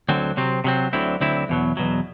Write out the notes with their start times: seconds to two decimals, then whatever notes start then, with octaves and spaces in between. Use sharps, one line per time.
0.09 D2 D3 F#3 C4
0.37 C3 F#3 C4
0.64 C3 F#3 C4
0.93 D2 D3 F#3 C4 E4
1.21 D2 D3 F#3 C4 E4
1.49 E2 B2 F#3
1.77 E2 B2 F#3